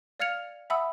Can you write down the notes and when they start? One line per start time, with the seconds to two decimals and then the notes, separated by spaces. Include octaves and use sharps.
0.20 D5 F5 F6 G#6 C#7 F7
0.70 E5 F#5 G#5 B5 D#6 E6